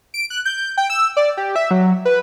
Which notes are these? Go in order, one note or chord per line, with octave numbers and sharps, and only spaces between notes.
D7
F#6
G6
G5
E6
D5
G4
E5
F#3
B4